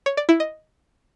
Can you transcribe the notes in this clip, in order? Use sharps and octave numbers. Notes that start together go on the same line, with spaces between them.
C#5
D5
E4
D#5